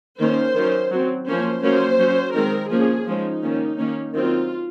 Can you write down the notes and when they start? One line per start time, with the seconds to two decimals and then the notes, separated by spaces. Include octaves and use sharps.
0.20 D#3 A#3 C#4 C5
0.55 D#3 F#3 C#4
0.91 F#3 C4
1.27 F3 A#3 C#4 C5
1.63 F#3 A#3 C#4 C5
1.99 F#3 C#4
2.35 D#3 G#3 C4 A#4
2.71 F3 A#3 C#4 G#4
3.07 F3 G#3 C#4 D#4
3.43 D#3 A#3 C#4
3.78 D#3 A#3 C#4
4.14 D#3 F#3 C4 F4